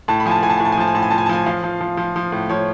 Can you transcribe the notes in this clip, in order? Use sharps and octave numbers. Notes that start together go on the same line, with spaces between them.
A2 A5
B5
F3 G#5
A5
A2 G#5
A5
A2 G#5
A5
G#5
F3 A5
G#5
A2 A5
G#5
F3 A5
G#5
A5
F3 G#5
F3 F5
F3
F3
F3
F3
A2
F3 C#5